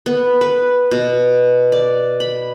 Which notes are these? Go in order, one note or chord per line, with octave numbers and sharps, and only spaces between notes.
B3
B4
B2
D5
B5